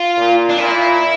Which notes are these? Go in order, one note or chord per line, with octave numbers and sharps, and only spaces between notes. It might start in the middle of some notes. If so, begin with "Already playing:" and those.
Already playing: F4
A#2
D4
A#2 E4